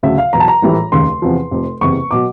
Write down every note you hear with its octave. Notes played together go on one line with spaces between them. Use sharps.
D2 C#3 F#3 E5
F5
E2 B2 F#3 A#5
A5
A#5
A#1 A2 E3 G3
F1 D#2 C#3 C6
E2 C3 F3
F1 F2 C3
F#1 E2 C3 C#6
B2 F#3 D6